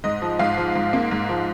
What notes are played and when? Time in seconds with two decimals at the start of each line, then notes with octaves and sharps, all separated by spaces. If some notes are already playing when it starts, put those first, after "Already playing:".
0.04 G#2 D#5
0.22 F3
0.39 G#2 F5
0.57 F3
0.75 G#2
0.93 A#3
1.11 G#2
1.29 F3